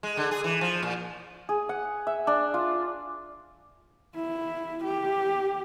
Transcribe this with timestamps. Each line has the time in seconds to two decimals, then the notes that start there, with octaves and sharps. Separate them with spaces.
0.03 G#3
0.17 D3
0.31 G#4
0.44 E3
0.61 F3
0.83 A#2
1.49 G#4
1.69 F#5
2.07 E5
2.27 D4
2.54 F4
4.15 E4
4.84 G4